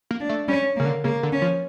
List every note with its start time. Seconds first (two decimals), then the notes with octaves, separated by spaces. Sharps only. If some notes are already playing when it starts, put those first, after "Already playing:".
0.11 A#3
0.20 D4
0.29 A3
0.48 G3 C#4
0.76 A#3
0.80 C#3
0.86 D3
1.04 C#3 A#3
1.23 D3
1.32 C#4
1.42 F3